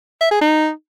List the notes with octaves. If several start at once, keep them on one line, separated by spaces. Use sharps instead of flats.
E5
G#4
D#4